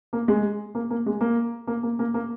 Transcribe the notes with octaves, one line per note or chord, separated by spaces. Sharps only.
A#3
G#3
A#3
A#3
G#3
A#3
A#3
A#3
A#3
A#3